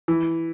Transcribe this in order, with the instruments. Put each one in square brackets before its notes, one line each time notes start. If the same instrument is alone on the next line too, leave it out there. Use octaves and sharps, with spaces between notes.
[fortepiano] E3